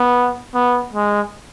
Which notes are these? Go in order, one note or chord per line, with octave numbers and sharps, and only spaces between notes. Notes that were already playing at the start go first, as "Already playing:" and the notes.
Already playing: B3
B3
G#3